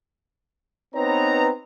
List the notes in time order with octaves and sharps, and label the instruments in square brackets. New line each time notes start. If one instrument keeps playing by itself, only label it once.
[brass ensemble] B3 C4 D#4 B4 C#5 A#5